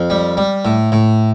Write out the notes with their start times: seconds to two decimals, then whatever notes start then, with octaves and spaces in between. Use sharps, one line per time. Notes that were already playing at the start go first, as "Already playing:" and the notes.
Already playing: F2 F5
0.10 G3
0.37 G3
0.65 A2
0.92 A2